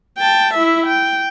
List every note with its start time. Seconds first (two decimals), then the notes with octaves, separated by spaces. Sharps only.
0.19 G5 A5
0.54 E4 E5
0.87 G5